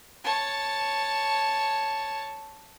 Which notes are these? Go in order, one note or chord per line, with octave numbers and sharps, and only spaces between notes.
C#5 A5